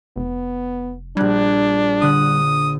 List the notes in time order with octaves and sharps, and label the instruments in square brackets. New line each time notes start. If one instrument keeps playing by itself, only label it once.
[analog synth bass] F1 [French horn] B3
[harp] A#1 F#6 G#6 [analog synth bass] G3 [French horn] D4
[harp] D3 F#6 [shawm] D#6